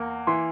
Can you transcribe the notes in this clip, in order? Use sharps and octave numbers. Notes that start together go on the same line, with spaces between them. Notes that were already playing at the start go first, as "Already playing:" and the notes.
Already playing: E2 A#3
E3 C6